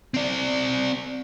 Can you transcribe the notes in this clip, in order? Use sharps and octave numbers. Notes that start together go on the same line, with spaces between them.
C4 D5